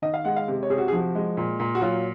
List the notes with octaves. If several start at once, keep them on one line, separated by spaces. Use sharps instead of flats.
D#3 D#5
F5
G#3 F#5
F5
C3
C#5
C3 G#4
F#4
G#4
F3 F#4
G#3
A#2
A#2
F#4
F#3 F4